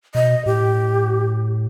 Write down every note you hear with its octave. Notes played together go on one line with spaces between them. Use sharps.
B2 D#5
A2 G4